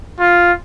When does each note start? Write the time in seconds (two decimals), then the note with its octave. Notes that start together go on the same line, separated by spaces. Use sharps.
0.19 F4